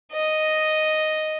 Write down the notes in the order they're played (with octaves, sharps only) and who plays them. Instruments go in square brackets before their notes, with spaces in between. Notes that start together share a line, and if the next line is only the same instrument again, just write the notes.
[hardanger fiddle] D#5